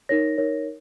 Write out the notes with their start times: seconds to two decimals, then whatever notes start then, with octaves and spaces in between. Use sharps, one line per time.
0.09 D#4 A#4 C#5 A#6
0.38 D#4 A#4 C#5